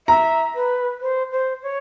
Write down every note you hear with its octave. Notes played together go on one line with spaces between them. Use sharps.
E5 A#5
B4
C5
C5
C#5